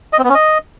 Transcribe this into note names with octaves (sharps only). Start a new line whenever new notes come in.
D#5
C4
B3
C#4
D#5